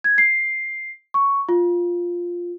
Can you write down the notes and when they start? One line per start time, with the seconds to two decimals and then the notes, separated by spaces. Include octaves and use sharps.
0.04 G#6
0.18 C7
1.14 C#6
1.49 F4